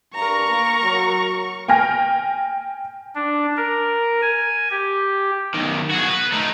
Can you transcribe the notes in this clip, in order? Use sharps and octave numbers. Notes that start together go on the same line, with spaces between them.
G2 A#4 A#5 C#6
A#3
F#3
G5 G#5 F6 A#6
D4
A#4
G#5
G4
B1 D#3
F#4 G#4
B4
A3 D#4